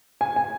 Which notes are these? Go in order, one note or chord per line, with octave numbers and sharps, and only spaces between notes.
G#5
G#5